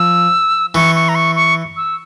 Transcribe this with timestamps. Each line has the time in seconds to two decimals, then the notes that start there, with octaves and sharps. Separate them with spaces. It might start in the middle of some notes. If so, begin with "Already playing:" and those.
Already playing: F3 E6
0.75 E3 C#6
0.95 C#6
1.09 A#5
1.15 C#6
1.36 C#6
1.77 E6